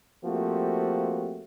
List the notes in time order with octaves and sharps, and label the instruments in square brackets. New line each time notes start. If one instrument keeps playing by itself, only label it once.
[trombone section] F3 A3 A#3 C4 F#4 G4